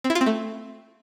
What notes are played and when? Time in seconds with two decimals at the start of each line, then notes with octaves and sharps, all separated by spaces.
0.04 C4
0.10 E4
0.15 F4
0.21 C4
0.26 A3